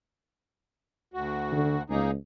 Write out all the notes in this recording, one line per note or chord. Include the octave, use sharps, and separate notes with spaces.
D2 F#4
D3
C#2 A#3 D#4 G#4